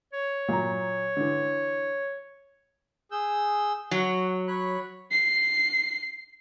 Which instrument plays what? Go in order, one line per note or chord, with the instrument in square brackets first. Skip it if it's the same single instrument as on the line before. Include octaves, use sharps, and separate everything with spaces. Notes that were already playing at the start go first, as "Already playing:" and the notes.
[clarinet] C#5
[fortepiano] A#2 F#3 A#5
D3 E3
[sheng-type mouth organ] G#4 E6 G6
[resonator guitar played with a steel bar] F#3 [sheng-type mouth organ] F#5
[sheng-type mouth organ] C#5 B5 F#6
[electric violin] C7